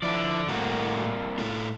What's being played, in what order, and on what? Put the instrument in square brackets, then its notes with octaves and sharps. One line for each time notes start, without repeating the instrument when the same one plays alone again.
[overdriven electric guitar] D3 D5 [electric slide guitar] F3 E4
[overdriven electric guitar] C2 A#3 [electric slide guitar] A2 A3 F#4
[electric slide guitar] A2 A3 F4